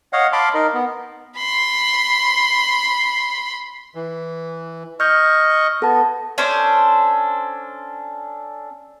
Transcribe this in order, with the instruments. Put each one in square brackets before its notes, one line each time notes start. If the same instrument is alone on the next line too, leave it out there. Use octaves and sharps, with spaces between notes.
[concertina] C#5 D#5 F5 F#5
F5 A5 B5 C6 D6
D#4 A#4 D#5
B3
[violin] B5 C6
[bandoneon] E3
[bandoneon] D#5 C#6 [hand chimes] F6 G6
[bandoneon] B3 [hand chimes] A4 A5
[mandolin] C#4 D4 A4 C5